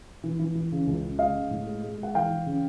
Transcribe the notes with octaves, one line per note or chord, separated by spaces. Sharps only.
E3
E3
E3
C#3
C#2
C#3
G#3 D#5 F5
G#3
A2
G#3
G#3
G#3
F#5
E3 F5 G5
E3
C#3